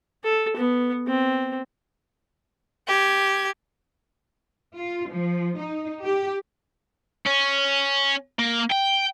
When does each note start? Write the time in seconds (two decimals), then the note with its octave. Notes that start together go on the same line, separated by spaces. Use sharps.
0.24 A4
0.56 B3
1.07 C4
2.88 G4 G#6
4.76 F4
5.10 F3
5.58 D#4
6.03 G4
7.26 C#4
8.39 A#3
8.72 G5